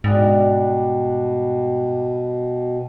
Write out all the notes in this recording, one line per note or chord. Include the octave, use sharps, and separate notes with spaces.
G#2 B2 G3 D4